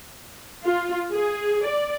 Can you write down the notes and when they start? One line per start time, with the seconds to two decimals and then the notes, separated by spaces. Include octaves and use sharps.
0.64 F4
1.13 G#4
1.66 D5